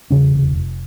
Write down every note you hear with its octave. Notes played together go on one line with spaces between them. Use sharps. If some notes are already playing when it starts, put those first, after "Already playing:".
E2 C#3 C#4
F1
F1